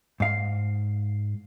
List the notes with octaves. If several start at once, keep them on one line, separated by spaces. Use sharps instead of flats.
G#2 F5